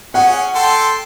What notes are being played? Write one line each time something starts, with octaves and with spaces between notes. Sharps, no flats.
C#4 G#4 F#5
A4 G5 C6